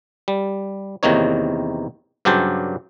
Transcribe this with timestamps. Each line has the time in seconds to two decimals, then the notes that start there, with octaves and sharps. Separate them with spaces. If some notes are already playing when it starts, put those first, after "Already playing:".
0.28 G3
1.03 E2 C3 D#3 A#3 D#4 C#5
2.25 G2 C#3 F#3 G4 C5 A5